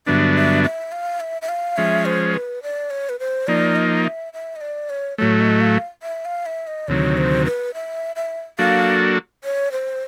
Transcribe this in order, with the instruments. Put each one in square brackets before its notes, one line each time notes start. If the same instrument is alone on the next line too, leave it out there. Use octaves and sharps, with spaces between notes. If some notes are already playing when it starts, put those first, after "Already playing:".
[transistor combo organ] G2 D3 F#3 B3 D4 [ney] E5
[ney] E5
E5
F5
E5
E5
F5
[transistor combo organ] F3 G#3 C#4 [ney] E5
[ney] C5
B4
D5
C#5
B4
C5
[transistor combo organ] F3 A#3 D#4 [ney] D5
[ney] D#5
E5
E5
D#5
D5
C#5
[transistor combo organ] A2 F#3 A3 [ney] C#5
[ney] D#5
F5
E5
F5
E5
D#5
[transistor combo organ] D2 C3 D#3 F#3 [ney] C#5
[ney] C5
B4
E5
E5
[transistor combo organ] F#3 A#3 D4 F#4 A4 [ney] F5
[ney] C#5
C5